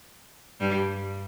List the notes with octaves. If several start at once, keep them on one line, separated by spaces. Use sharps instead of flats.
G2 G3